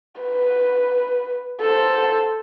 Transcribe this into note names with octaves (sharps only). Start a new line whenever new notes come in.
B4
A4 C5